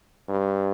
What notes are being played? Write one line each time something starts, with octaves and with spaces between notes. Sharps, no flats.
G2